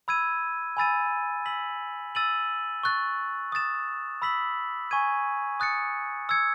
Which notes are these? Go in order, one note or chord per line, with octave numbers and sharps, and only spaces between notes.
B5 E6 G#6 D#7
G#5 B5 E6 A6 D#7
E6 B6 F#7
E6 A6 D#7 F#7
C#6 F#6 A6
D#6 A6 E7
B5 E6 B6 F#7
G#5 C#6 G#6 D#7
D#6 F#6 A6 C#7
E6 G#6 C#7